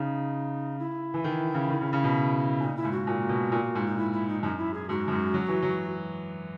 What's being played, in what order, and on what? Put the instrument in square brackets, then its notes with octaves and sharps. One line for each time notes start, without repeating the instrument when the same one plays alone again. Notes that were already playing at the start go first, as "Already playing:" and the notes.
Already playing: [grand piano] C#3 [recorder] D#4
[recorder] E4
[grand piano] E3
D#3
C#3
D#3
C#3
C#3
B2
[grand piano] A#2 [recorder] D#4
[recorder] E4
[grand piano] G#2
[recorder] F#4
[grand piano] A#2
B2
A#2
G#2
[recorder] D#4
E4
E4
D#4
[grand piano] F#2 [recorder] D#4
[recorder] E4
G#4
[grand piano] G#2 [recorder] F#4
[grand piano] F#2
G#2
F#3
E3
F#3